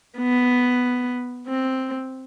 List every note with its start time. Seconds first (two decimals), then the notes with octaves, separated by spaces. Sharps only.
0.18 B3
1.47 C4